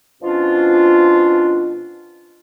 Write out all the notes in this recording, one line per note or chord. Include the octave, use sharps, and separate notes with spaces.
B2 F3 C#4 D4 F4